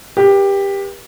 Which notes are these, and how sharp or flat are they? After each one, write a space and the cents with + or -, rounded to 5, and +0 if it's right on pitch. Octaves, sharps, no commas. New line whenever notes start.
G4 +15 B4 -45